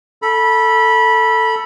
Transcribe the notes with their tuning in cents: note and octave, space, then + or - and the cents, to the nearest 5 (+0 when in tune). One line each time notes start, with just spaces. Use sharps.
A4 +10 B5 -20